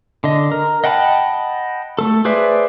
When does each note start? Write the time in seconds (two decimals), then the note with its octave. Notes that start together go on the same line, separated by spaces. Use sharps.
0.24 D3 D#5
0.52 A#4
0.84 D#5 F#5 G5 A5 B5
1.99 A3 A4
2.25 G#4 B4 C5 D5 E5